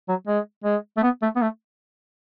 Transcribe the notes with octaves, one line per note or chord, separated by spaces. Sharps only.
F#3
G#3
G#3
A3
B3
A3
B3
A3